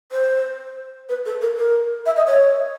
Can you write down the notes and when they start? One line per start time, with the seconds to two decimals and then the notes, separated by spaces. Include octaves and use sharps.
0.12 C5
1.09 B4
1.25 A4
1.41 A#4
1.57 A#4
2.05 E5
2.16 D#5
2.27 C#5